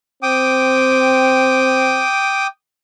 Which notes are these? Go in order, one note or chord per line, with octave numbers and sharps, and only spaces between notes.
C4 G5 D6 D#6